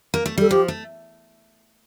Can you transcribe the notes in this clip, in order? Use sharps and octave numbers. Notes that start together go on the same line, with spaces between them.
A#3
A3
G3 A4
F3 G4
A3